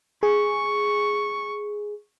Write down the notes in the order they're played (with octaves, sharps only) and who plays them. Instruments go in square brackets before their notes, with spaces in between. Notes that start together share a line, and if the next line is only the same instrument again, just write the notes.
[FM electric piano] G#4 [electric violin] C#6